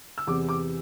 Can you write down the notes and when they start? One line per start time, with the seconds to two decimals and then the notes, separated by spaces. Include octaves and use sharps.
0.18 E6
0.27 E2 C3 E3 D6
0.49 D6